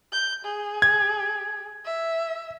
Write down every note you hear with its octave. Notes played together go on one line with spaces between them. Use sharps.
G6
G#4
G#6
E5